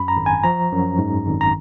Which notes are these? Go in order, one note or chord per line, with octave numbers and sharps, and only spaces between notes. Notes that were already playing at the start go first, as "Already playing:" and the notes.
Already playing: F#2 B5
A#5
G#1
G#5
F3 A#5
F#2
G#2
G#1
A#5